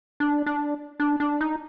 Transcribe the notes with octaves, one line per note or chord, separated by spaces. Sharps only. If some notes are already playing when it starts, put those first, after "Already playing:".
D4
D4
D4
D4
D#4